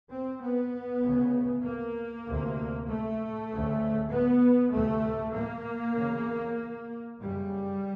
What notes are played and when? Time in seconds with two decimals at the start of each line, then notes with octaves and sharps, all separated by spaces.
0.11 C4
0.41 B3
1.03 D2 C#3
1.65 A#3
2.26 D2 C3
2.88 A3
3.50 D2 C#3
4.11 B3
4.73 D2 C3 A3
5.35 A#3
5.97 E2 C#3
7.20 F#2 C#3 G3